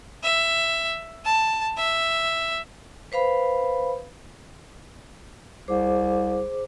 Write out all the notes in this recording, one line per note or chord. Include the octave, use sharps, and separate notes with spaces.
E5
A5
E5
B4 C5 F5 B5
C2 G#4 C5 D6